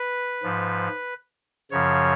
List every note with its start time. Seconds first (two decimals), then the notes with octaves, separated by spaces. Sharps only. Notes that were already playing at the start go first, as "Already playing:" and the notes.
Already playing: B4
0.43 G#2 F3
1.71 F#2 C#3 F3 C#5